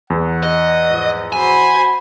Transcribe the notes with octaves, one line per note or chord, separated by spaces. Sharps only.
E2 F#5
D#5
G#2 F3
F#4 C5 G#5 B5